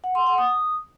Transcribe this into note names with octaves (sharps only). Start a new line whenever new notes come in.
F#5
C6
F#5
D#6